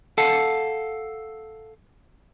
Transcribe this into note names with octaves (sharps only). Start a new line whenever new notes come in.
A4 F5 F#5 A5